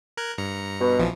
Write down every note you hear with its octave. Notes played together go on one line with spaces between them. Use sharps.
A#4 F#6 G#6
G2 A#5 C#7
B2
A#1 E3 F3